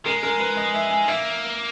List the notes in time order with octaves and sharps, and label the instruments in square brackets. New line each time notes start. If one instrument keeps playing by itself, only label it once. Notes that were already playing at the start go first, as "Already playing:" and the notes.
[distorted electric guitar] G#3 [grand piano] A#4
[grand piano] A#4
B4
D#5
E5
G#5
[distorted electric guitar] A#3 [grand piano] E5